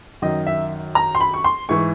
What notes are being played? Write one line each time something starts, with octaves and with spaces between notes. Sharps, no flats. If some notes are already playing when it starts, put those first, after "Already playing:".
F#2 D#3 D#5
E5
A#5
C6
B5
C#6
C6
G#2 E3 C#6